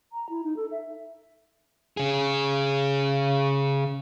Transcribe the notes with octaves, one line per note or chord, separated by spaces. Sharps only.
A#5
E4
D#4
A4
E5
C#3 G#4